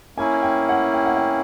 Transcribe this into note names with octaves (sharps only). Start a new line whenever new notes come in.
A#3 C#4 E4 G#5
G5
F#5
G5
F#5
G5